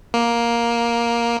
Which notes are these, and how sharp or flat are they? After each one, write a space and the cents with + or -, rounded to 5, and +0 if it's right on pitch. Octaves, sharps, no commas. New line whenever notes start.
A#3 +10